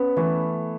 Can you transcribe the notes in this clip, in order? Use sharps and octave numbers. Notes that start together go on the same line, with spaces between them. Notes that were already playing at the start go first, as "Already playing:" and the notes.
Already playing: B3 C#4
E3 A3